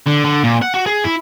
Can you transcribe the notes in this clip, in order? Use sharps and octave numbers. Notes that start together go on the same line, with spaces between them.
D3
D3
A#2
F#5
F#4
G#4
E4